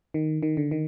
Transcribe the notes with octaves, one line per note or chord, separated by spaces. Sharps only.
D#3
D#3
D3
D#3